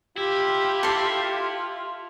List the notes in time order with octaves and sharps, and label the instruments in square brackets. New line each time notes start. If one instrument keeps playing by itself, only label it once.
[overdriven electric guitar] E4 [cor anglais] F4 [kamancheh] G4
[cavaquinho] A4 C6